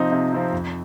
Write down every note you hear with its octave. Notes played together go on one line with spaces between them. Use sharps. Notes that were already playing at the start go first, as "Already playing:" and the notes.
Already playing: C3 F3 C4 D#4
C3
F3 C4 D#4
F2